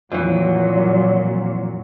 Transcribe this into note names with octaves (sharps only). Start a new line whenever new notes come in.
F2 A#2 E3 F#3